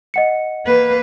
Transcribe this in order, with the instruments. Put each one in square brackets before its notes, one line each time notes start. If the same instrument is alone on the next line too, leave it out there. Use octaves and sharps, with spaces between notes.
[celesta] D#5 F#5 C#7
[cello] A#3 B4